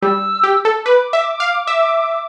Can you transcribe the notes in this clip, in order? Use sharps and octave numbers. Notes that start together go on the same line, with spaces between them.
G3 E6
G4
A4
B4 D6
E5
F5
E5